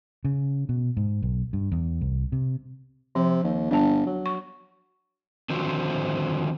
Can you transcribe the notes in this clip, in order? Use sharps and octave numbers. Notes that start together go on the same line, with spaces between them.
C#3
B2
G#2
B1
G2
E2
C2
C3
C3 F3
D#2
G1 D4 A5
F#3
C#6
D3 D#3 F3 C4 F#4 C5